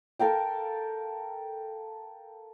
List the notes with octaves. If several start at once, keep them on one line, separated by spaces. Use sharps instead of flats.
A4 A#4 F5 G5